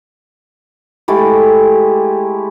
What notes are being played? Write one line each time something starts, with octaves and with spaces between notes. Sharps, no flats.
G#3 A3 E4 G4